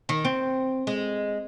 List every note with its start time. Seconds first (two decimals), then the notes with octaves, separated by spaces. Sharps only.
0.09 D#3
0.25 C4
0.87 G#3